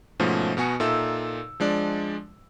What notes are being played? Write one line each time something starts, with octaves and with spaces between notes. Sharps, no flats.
G#2 B2 F3 A3 C#4
B2 B3 F#4 G#5 C#7
A#2 D#4 A4 E5 E6
F3 G#3 D4 D5